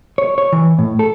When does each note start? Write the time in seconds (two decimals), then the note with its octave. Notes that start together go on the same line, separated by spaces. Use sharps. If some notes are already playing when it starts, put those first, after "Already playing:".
0.18 C#5
0.38 C#5
0.52 E3
0.79 A2
0.99 A4